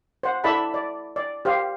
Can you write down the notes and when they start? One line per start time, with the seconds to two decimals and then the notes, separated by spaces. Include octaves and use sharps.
0.23 C5 F#5
0.44 E4 A4 D5 E5 A5 B5
0.74 D5
1.16 D5
1.45 G4 C5 F5